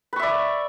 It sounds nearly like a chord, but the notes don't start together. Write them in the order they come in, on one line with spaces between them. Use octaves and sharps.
B4 C#6 E5 D5